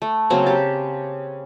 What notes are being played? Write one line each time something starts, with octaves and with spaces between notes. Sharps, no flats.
A3
C#3 F#3 A#3 C4
G4 A5